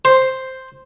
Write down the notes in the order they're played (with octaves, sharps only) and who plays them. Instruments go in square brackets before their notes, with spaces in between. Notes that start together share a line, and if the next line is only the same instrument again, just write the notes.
[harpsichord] C5